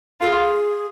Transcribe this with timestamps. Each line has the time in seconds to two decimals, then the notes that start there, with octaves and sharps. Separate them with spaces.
0.21 F4 A4
0.27 G#4